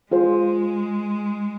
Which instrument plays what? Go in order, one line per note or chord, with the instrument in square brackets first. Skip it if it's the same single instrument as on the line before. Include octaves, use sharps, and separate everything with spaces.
[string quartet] G#3 [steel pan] F4 G#4 C5